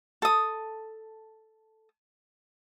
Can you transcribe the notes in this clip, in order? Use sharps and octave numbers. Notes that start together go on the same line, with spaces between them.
A4 D#6